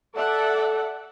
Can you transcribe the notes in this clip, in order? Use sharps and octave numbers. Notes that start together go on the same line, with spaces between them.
A4 D5 E5 F#5